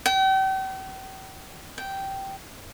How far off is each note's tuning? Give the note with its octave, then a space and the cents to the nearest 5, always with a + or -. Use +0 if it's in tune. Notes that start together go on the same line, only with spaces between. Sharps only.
G5 -40
G5 -10